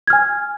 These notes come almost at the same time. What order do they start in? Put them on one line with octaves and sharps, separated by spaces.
G#6 F6 G#5